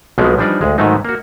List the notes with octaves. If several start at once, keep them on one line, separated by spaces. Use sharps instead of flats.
B1 B2 F3 G#3 B3 C4
E3 F3 G3 D4 D#4 D5
D2 G#3
G#2 D#3 F#3 A3 D#4
A#3 F#4